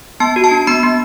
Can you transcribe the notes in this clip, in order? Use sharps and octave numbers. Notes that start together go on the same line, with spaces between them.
B3 A5
F#4
A5
D4
B3 B5
B3